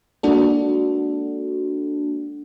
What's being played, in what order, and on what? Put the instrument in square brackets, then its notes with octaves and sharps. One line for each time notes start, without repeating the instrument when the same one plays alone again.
[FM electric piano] G#3 A#3 D4 F#4 A4